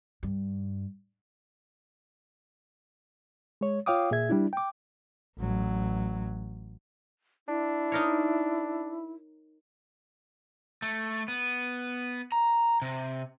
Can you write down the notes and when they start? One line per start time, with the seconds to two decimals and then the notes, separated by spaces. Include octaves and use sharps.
0.23 G2
3.61 G#3 C#5
3.86 F4 C#5 F5 G5 D6 D#6
4.11 A#2 G#4 E5 G#6
4.29 G3 D4 E4
4.53 G5 D6
5.38 A1 F#3
7.48 D4 E4
7.92 D#4 A#4 C#5
10.82 A3
11.28 B3
12.32 A#5
12.82 C3